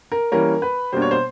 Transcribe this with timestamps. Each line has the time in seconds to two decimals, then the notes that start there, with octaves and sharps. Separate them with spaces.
0.12 A#4
0.32 E3 G3 A#3 C#4 A#4
0.62 B4
0.93 B2 G3 A#3 D4 C5
1.02 C#5
1.11 C5